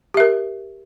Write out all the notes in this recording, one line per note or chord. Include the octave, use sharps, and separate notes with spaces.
G4 A#4 E5